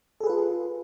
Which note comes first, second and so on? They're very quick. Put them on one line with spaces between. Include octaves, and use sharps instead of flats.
A4 G#4 B4 F4